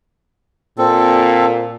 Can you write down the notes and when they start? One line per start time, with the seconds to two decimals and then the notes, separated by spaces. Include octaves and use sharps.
0.78 A#2 C4 A4